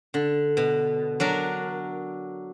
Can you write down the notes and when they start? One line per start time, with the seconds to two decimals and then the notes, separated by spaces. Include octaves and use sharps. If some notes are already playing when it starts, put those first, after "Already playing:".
0.14 D3
0.57 B2
1.20 F#3 D4 A#4